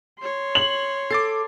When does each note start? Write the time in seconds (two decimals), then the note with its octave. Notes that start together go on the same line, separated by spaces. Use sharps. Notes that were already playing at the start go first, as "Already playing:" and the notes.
0.19 C#5 C6
0.55 F#7
1.11 A4 D6 A6 C7